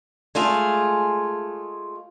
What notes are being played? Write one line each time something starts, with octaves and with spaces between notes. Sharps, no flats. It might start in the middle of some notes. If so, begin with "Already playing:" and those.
G#3 A3 F4 G#4